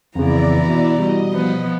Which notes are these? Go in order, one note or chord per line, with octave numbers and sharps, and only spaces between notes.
F2 C#3 E3 B3 E4 D5 A#5
B2
B2 G3 D#5
F3 B3